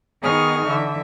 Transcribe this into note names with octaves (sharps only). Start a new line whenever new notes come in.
D#3 B3 D#4 G#4 C#6 F6
D3 E3 E5